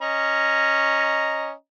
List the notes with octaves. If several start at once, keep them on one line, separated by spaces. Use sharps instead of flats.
C#4 D#5 A#5